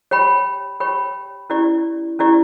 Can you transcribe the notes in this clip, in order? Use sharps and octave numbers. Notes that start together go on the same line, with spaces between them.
G4 C#5 G5 B5
G4 C#5 G5 B5
C#4 E4 G4 D5
C#4 E4 G4 D5